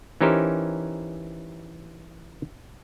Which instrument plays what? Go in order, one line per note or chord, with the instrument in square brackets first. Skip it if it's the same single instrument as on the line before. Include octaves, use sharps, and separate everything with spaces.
[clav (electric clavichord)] E3 C#4 D#4 G4 A#4 C5